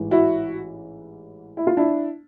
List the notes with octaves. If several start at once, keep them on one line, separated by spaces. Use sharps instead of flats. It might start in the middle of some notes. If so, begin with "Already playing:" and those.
Already playing: A1 G#2 E3
E4 F#4
E4
F4
D4 E4